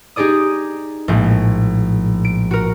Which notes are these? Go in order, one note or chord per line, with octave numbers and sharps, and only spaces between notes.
D#4 G4 G#4 D5 D#6
A#1 A2 F3 G#3
D7
F#4 A#4